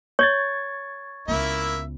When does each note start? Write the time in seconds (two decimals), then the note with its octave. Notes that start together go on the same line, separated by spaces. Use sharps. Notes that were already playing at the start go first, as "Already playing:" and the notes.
0.19 C#5 C#6 G#6 A6
1.28 C#2 A#3 B3 E4 E5